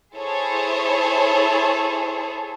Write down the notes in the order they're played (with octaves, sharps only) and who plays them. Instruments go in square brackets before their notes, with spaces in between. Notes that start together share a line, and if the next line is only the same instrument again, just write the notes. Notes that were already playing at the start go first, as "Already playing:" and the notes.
[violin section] E4 G#4 A4 C5 C#5